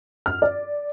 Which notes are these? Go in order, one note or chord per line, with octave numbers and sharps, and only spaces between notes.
F6
D5